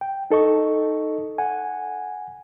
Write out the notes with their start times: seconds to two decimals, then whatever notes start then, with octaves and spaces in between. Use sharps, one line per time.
0.01 G5
0.31 D#4 A4 D#5 C#6
1.38 F#5 G#5